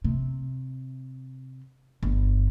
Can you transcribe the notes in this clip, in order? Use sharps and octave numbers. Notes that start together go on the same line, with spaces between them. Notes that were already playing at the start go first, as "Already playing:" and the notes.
C3
G1